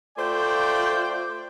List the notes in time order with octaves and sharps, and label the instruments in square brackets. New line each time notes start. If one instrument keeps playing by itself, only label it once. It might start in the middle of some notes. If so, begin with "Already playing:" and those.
[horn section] A3 F4 C5 D5 G5